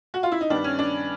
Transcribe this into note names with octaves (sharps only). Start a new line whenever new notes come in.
F#4
F4
E4
D#4
G2 D#3 G3 B3 D4
C#4
D4